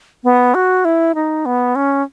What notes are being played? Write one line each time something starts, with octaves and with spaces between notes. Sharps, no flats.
B3
F#4
E4
D#4
B3
C#4